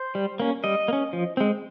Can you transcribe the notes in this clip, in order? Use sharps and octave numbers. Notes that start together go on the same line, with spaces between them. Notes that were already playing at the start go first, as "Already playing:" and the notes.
Already playing: C5
G3
A#3 C#4
G3 D#5
A#3
C#4
F3
G#3 C4